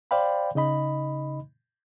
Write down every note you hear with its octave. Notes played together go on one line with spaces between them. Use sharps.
C5 D5 F5 G5 B5
C#3 D#4 D#5 B5